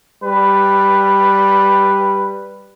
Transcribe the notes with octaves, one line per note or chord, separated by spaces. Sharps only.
G3 B4